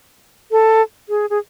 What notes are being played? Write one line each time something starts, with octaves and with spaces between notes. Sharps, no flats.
A4
G#4
G#4